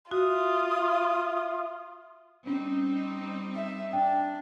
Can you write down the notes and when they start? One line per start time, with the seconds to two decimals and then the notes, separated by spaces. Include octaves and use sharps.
0.11 F4 F#4 E5 D#6
2.47 G3 C4 C#4 D#4
3.55 E5
3.93 D4 G5